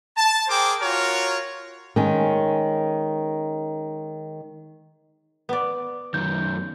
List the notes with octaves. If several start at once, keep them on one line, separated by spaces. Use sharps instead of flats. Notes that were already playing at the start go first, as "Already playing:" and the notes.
A5
G#4 A#4 C5 G5 D6
F4 F#4 A#4 C#5
D#3 G#3 C#4
B3 D5
F#2 D#3 G6